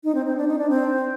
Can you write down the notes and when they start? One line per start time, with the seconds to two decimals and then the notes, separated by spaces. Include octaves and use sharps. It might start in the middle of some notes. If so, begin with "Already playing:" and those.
0.04 D#4
0.15 C4
0.26 C4
0.37 D4
0.48 D#4
0.59 D4
0.70 C4